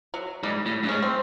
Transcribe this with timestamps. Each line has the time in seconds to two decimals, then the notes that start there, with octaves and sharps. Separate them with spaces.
0.14 F#3
0.43 G#2 G3
0.66 A2
0.83 G2
0.88 G#2 C#4
1.02 C4